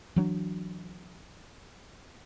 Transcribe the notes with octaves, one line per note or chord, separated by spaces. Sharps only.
E3 F#3 D4